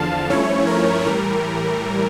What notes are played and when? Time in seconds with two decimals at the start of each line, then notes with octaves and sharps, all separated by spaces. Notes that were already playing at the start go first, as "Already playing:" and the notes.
Already playing: E2 D3 F3 F5 A5
0.30 G2 F3 A3 C#4 E4 C#5
0.67 A#4
1.04 A2 E3 G3 A#4